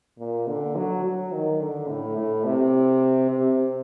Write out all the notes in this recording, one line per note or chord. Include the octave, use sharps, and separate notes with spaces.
A#2
D3
F#3
F#3
D#3
D3
A2
A2
C3
C3